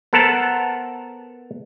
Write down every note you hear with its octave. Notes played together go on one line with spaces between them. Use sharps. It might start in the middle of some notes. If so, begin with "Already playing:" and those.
B3 A4 A#4 C5 F#5 A5